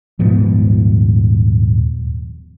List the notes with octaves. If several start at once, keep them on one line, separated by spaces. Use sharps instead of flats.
D#1 G#2 F3 B3